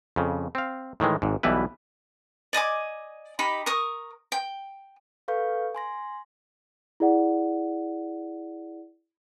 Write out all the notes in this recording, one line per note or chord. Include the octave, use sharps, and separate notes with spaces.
F2 C#3
C4 F5
A2 D#3 E3 G#3
G#1 G#2
B1 B2 E3 G3 E4 B4
D5 D#5 G#5 D6
D#4 G4 B5
A#4 C#6 D#6
G5
A4 B4 F5 C#6 G6
G#5 C6 A#6
E4 G#4 D5 F#5